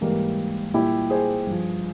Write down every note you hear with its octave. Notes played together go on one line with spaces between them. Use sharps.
G#2 E3 G3 A#3
A#2 G3 E4 G4
G#4 C5
G2 F3